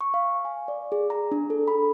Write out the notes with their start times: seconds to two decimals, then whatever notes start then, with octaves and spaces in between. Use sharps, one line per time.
0.01 C#6
0.14 F5
0.45 G#5
0.68 D5
0.92 G#4
1.10 A#5
1.32 D4
1.50 A4
1.68 B5